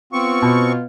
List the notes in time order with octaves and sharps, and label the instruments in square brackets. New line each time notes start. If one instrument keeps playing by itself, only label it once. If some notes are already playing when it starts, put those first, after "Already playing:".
[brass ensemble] B3 F4 [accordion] C4 C#6
[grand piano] B2